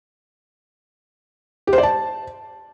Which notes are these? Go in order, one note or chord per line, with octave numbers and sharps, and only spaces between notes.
G4
C5
D5
A5